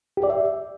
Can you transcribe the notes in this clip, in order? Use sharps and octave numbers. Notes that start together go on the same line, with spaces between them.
G4
D5
E5